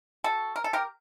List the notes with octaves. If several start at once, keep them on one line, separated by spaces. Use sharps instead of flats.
F#4 A4
A#4
A4
G4 A#4